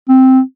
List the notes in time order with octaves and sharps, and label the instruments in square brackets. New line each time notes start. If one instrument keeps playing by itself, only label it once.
[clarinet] C4